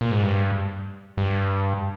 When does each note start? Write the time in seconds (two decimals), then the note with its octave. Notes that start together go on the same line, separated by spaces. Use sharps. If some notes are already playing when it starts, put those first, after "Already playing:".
0.01 A#2
0.11 G#2
0.23 G2
1.17 G2